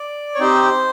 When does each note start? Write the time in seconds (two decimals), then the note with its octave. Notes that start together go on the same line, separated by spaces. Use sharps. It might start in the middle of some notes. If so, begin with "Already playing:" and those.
Already playing: D5
0.35 C#5
0.39 C4 D#4 G4 C5